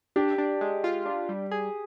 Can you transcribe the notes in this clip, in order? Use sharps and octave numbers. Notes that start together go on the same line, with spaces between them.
D4 G4
D4
G#3
F4
D4
G3
G#4